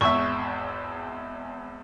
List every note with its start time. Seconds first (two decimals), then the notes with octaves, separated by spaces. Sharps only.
0.01 G#1 E2 E5 C#6